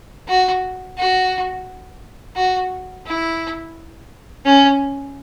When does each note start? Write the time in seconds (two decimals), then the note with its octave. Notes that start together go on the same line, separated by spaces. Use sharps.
0.28 F#4
0.97 F#4
2.36 F#4
3.06 E4
4.45 C#4